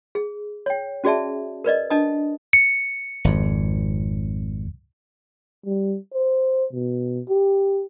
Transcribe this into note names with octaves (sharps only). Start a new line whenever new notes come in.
G#4
C#5 G5
C#4 F#4 G#4 D5 E5 A5
A#4 B4 D5 D#5
D4 D#5 A5 D#6
C#7
G#1 F2
G3
C5
B2
G4